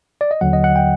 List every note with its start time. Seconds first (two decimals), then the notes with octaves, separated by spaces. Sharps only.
0.21 D5
0.31 D#5
0.41 D#2 D3 F#3 F#5
0.53 D#5
0.64 F#5
0.76 G5